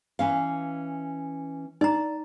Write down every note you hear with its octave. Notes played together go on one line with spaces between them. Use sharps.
E3 C#4 F5
D#4 D5 A#5